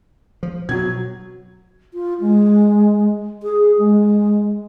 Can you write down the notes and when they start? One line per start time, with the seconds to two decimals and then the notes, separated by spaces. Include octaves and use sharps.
0.43 F3
0.69 B2 F#3 G#6
1.94 F4
2.21 G#3
3.43 G#4
3.79 G#3